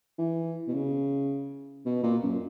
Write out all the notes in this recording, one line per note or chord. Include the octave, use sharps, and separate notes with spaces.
E3
B2
C#3
B2
A#2
F#2